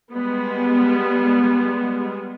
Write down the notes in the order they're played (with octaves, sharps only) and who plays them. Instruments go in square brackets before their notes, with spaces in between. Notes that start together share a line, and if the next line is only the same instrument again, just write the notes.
[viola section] G3 G#3 B3